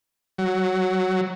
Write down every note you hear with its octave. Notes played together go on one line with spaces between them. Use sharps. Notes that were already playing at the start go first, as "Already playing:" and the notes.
F#3